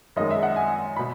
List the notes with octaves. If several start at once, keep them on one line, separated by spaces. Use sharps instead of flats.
F#2 D#3 G#3 D#5
E5
F#5
G#5
B2 B5